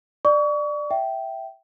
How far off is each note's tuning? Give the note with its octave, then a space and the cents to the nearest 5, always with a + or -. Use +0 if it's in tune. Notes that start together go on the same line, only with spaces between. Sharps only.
D5 +15 C#6 +35
E5 +0 G5 -15